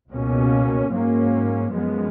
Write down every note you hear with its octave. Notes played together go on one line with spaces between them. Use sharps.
C#2 B2 A#3 C#4
G#2 F#3 A#3 C#4
F#2 F3 G#3 B3